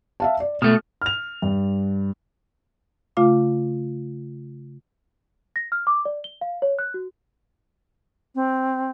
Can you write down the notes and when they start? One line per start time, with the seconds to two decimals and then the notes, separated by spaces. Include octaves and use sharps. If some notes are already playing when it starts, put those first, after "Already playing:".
0.20 E5 F5 A5
0.40 D5
0.62 B2 A3 F6
1.02 F6 F7
1.42 G2
3.17 C#3 A3 F4 F5 D6
5.56 A#6
5.72 F6
5.87 D6
6.05 D5
6.24 G7
6.41 F5
6.62 C#5
6.79 F#6
6.94 F#4
8.35 C4